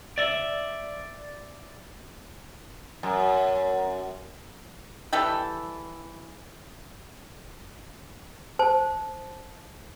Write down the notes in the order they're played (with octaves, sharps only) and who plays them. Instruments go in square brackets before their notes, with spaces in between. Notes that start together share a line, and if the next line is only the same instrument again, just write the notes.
[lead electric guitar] D5 E5
[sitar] F#2
[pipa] E3 G3 A4 G5
[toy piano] C5 A5